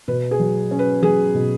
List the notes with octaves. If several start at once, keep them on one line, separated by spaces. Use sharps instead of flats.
B2 B4
G#4
F#3
C#4
B4
F#3 G#4
B2